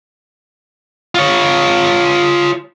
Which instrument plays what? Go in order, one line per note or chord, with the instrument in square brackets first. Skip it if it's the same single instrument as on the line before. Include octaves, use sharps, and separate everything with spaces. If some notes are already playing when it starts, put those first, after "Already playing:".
[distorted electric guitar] F4 C#5